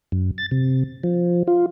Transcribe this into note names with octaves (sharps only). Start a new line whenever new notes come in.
F#2
A6
C3
F3
F4